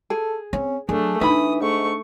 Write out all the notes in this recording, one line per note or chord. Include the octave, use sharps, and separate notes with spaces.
G#4 A4
C4 C#4
F#3 A3 D4 G#4
E3 D4 D#4 E5 B5 D#6
G#2 A3 C#6